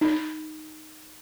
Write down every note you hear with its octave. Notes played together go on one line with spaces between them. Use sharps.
D#4